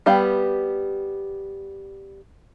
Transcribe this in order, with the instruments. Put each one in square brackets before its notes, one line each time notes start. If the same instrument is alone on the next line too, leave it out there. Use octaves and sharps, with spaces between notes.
[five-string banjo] G3 B3 G4 F5 B5